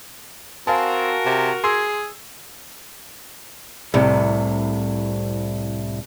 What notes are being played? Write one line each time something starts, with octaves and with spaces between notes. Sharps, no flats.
C4 F#4 A#4 F5 G#5 A5
C3
G#4 C6 E6 G#6
C2 A2 C3